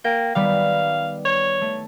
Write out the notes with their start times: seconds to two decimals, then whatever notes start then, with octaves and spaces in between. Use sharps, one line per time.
0.04 A#3 G5
0.35 D#3 G3 B3 F5
1.25 C#5
1.61 A3